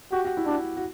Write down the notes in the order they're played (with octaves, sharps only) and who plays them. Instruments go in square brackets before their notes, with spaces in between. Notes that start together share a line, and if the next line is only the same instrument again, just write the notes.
[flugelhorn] F#4 [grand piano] G4
[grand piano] F#4
E4
[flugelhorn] D4 [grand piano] F#4
[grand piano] F#4